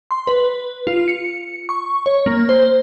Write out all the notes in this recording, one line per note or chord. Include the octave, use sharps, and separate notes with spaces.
C6
B4
F4
C#7
C#6
C#5
A#3
C5